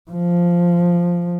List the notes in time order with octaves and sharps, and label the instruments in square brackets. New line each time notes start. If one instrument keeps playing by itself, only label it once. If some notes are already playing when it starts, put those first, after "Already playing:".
[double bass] F3